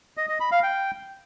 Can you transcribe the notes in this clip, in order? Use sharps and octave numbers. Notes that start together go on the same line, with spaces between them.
D#5
D#5
B5
F5
G5